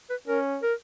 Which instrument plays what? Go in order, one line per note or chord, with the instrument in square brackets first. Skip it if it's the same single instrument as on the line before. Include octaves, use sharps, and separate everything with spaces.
[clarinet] B4
[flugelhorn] C#4 [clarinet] A#4
[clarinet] A#4